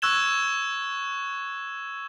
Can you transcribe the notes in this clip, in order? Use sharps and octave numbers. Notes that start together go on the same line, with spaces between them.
C#6 E6 F#6 G#6 E7 G7